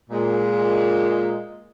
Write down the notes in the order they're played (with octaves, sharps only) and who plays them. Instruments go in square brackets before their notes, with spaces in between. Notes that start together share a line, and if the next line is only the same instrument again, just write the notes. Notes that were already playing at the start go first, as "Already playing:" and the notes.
[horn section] A#2 G#3